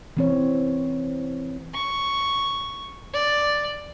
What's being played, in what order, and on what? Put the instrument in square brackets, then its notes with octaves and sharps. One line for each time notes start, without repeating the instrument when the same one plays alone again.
[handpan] E3 C4 C#5
[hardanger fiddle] C#6
D5